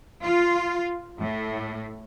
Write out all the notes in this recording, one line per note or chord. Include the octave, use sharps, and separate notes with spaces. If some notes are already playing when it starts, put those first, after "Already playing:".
F4
A2